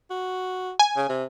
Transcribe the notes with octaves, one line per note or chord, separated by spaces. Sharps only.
F#4
G#5
C#3
C3